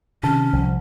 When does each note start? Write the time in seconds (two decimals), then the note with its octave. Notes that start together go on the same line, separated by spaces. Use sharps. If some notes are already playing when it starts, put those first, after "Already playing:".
0.23 C3 D#3 C#4 A5
0.53 C2 F3